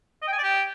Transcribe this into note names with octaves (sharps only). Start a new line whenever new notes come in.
D#5
G5
G#5
D5
G4